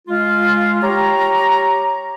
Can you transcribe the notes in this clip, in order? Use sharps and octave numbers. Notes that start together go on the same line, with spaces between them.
G#3 F4
G4 C#5 A#5